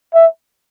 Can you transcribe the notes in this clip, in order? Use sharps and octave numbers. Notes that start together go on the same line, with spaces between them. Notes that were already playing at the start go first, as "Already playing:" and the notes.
E5